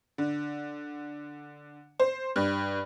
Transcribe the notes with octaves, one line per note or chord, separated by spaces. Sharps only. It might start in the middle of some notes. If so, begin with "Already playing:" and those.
D3
C5
G2